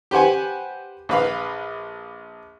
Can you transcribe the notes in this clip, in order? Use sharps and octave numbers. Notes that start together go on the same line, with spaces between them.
G4 B4 C5 F#5 G#5
A#1 B4 F5